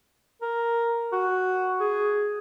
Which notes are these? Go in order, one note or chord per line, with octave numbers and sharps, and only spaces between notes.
A#4
F#4
G#4